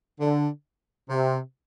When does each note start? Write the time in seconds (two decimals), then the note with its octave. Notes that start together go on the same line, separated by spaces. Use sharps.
0.20 D3
1.10 C3